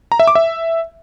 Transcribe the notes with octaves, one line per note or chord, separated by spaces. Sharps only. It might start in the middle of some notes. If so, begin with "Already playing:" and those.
A#5
E5
D6
E5